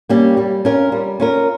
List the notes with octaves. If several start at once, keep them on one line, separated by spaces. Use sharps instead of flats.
G3 A#3 C#4 G4
G3
C#4 F4 A#4
G3
C#4 F4 A#4